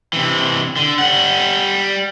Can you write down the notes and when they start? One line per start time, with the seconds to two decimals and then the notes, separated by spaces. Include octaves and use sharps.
0.13 C3 E3
0.76 D3
0.99 G3 F#5